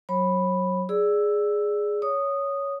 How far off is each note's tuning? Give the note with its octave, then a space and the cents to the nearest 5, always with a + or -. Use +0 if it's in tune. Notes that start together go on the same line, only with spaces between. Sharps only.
F#3 +0 C#5 -40 B5 +0
G#4 +0 D5 +0 E6 +0
C#5 +10 D#6 -10